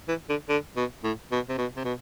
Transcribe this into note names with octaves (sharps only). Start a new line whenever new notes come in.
E3
D3
D3
B2
A2
B2
C3
B2
C3
B2